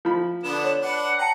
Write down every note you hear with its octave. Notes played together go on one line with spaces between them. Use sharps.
F3 B5
D3 B3 D4 E7
C#5
D4 B4 F#5
G5 A5 A#5